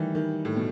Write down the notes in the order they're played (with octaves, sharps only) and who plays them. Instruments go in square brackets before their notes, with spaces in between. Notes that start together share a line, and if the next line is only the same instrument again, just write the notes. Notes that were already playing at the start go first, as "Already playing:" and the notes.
Already playing: [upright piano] D#3 E3 G3
D#3
A2
B2